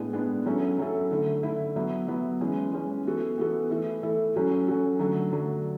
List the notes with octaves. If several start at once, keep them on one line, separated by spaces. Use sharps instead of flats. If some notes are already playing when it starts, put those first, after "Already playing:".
Already playing: A2 G#3 B3 D4 G#4
A2 G#3 B3 D4 G#4
F#3 C#4 E4 A4
F#3 C#4 E4 A4
D3 A3 E4
D3 A3 E4
F#3 B3 E4
F#3 B3 E4
E3 G#3 C#4
E3 G#3 C#4
E3 B3 F#4 A4
E3 B3 F#4 A4
E3 A3 E4 A4
E3 A3 E4 A4
F#3 C#4 F#4 A4
F#3 C#4 F#4 A4
D3 F#3 A3 D4 A4
D3 F#3 A3 D4 A4